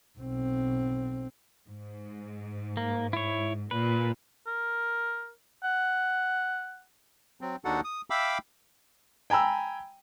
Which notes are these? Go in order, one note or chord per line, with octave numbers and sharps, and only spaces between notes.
B1 C4
G#2
A#3
E4 C#5
A#2 B4
A#4
F#5
F#3 C4
D#2 D4 D#4 F#4 A4 F#5
D#6
E5 F5 G5 B5 D6 E6
G5 G#5 A#5 B5 E6